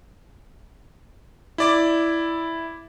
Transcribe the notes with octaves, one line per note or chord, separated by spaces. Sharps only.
E4 D5 D6